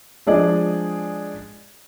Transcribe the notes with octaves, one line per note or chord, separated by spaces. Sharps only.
F3 G#3 D4 G#4 D5 D#5